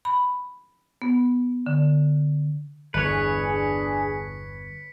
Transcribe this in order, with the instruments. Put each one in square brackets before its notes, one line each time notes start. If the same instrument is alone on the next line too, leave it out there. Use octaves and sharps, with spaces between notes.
[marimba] B5
B3
D3
[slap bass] G1 E2 [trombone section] D4 G#4 [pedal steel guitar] B4 C#5 [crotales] B6 C#7